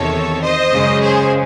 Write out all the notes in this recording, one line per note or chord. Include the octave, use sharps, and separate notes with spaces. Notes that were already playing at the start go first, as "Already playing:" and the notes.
Already playing: E2 C3 D#3 A4 C#5
C5 D#5
F#2 C#3 G#3
G#4 C5